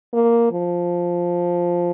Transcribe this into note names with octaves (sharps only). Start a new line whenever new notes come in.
A#3
F3